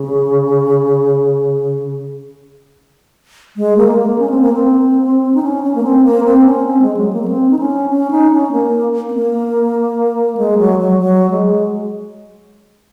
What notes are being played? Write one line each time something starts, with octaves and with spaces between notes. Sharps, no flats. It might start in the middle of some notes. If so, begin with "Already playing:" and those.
Already playing: C#3
G#3
A#3
G#3
A#3
C#4
C4
A#3
C4
D#4
C#4
C#4
A#3
C4
A#3
C4
C#4
C4
G#3
F#3
A#3
A#3
C4
D#4
C#4
C#4
D#4
C#4
A#3
C4
A#3
G#3
F#3
F#3
F#3
G#3